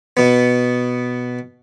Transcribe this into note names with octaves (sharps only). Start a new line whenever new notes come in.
B2 B3